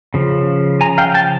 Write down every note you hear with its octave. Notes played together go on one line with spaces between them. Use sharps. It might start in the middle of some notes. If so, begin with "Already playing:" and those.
C#3 F3
G#5 A#5
F5 G5
G5 A5